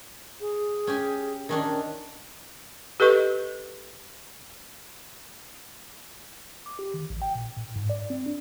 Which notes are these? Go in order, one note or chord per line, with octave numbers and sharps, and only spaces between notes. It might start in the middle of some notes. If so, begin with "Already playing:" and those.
G#4
C#4 G4 G#5
D#3 C#4 D4
G4 A4 B4 D#5 C#6
D6
G4
D#3
A1
G5
A#2
A2
G#2
D5
C4
D4